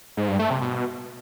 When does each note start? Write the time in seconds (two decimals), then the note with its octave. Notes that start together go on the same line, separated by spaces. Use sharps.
0.17 G#2
0.28 G2
0.39 A3
0.50 C3
0.61 B2